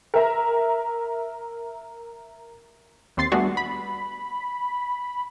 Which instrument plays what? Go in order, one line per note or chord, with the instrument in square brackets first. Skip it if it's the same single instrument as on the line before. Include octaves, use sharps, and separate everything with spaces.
[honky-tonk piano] A#4 E5 A#5
[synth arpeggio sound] D#2 C4 C6 A6 C7
G3 A3 B3 D4 F#4 G#4
B5